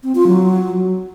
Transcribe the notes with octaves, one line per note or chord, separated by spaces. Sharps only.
C4
F4
F#3